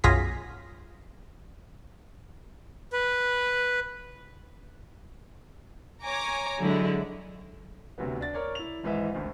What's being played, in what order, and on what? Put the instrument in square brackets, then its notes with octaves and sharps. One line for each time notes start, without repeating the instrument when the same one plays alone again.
[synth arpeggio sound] B1 F#2 F4 G#4 A#6 B6
[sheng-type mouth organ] B4
[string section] C#5 G#5 A#5 D6
D3 F#3 G#3 E4
[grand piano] D2 C3 F#3 B3
D4 A6
A#4 C#5 D5
E4 F7
G#1 G#2 E3 D#5 E5
G#1 D2